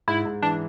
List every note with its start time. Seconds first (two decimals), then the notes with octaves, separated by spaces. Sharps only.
0.08 G#2 E4
0.25 G#2
0.42 E3 D4